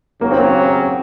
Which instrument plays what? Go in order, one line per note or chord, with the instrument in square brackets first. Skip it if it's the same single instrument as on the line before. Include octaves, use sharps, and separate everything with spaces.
[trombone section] D#2 C#3 F#3 [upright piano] A#3
[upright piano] C4
A#3